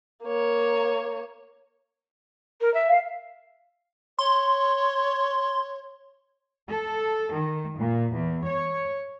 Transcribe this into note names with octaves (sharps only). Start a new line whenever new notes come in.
A#3 C#5
A#4
E5
F5
C#5 C6
A4
D#3
A#2
E2
C#5